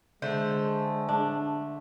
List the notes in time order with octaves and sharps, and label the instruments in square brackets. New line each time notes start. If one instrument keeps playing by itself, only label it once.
[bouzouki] D3 A3 C5 [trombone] G#3
[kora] D4